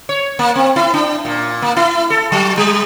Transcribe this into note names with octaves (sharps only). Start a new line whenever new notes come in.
C#5
A#3
C4
E4
D4
A#2
A#3
E4
A4
F#3
G3